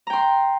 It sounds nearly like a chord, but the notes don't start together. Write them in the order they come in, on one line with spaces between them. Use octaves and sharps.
A#5 G5 C6